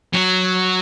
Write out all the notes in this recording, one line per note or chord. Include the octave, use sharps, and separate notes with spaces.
F#3 F#4